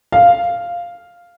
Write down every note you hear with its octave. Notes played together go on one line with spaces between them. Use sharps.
F5